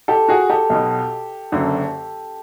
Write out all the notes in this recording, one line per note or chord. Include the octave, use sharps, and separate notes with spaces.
G4 A4
F#4 G#4
G4 A4
B1 B2
F#1 F#2 D3